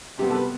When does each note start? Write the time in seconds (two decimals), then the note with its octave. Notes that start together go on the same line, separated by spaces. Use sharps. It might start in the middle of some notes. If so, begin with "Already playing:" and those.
0.18 C3 G3 B3 G4
0.30 A4
0.34 B4